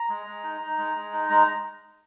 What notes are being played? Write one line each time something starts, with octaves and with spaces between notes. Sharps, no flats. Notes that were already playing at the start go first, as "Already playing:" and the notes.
Already playing: A#5
G#3
G#3
D#4
D#4
G#3
G#3
D#4
G#3 A#5